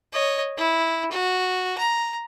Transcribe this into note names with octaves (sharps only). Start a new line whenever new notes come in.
C#5 D#5
E4
F#4
A#5